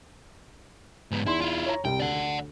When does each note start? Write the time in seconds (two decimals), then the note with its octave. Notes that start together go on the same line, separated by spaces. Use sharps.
1.11 G#2 B3
1.26 E2 D#4 E4 C6
1.41 E4 F4
1.66 C#5 A#5
1.85 C2 C3 G5
2.00 D2 D5 F#5